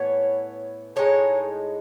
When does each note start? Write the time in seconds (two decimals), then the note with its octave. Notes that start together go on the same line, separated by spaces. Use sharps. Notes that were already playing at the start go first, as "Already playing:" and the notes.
Already playing: A2 E3 B3 C#5
0.96 A2 G#3 D#4 C#5